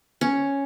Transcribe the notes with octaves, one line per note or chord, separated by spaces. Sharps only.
C#4